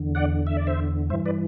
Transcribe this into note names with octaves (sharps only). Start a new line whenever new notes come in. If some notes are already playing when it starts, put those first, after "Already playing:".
Already playing: E2 D3
D5 F#5
E5
D5
C5 E5
G2 E3 C5 E5
B4 D5